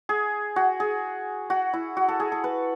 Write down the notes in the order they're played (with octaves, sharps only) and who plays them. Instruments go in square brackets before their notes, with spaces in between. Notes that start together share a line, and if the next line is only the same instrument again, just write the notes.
[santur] G#4
F#4
G#4
F#4
E4
F#4
A4
G#4
A4
B4